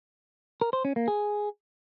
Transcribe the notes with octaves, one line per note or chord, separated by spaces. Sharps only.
A#4
C5
C#4
A#3
G#4